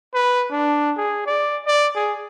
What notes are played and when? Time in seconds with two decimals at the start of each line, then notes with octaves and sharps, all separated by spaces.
0.14 B4
0.50 D4
0.97 G#4
1.26 D5
1.66 D5
1.95 G#4